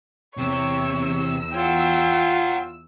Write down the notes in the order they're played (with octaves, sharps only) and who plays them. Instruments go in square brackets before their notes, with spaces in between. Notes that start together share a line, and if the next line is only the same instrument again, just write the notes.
[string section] E2 E6 [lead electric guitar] C3 [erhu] C#5
[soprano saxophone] F4 [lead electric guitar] C#5 F#5 [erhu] G5